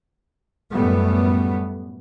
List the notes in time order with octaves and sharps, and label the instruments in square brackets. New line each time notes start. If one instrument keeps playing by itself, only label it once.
[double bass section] F#2 A2 G3 A3 B3